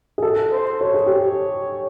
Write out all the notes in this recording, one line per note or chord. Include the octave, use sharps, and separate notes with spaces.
G#4
A4
C5
A4 C#5
G#4
G4